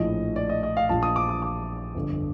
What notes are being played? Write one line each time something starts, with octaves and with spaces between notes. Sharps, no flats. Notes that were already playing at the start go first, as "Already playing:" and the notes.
Already playing: A#1 A2 F3 D#5
D5
D#5
D#5
F5
A#1 A#2 F3 A5
D#6
D6
D#6
D6
G1 F2 D3